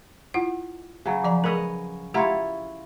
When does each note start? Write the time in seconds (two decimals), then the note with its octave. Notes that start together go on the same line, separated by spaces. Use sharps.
0.34 E4 F4 F#5
1.05 C#3 F#3
1.24 F3 D5 A#5
1.44 G#4 A#4 B4 C#5 D#5
2.14 E4 F4 G4 C#5 F#5 A#5